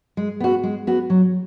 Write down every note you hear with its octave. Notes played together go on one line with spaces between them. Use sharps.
G#3
B3 F#4
G#3
B3 F#4
F#3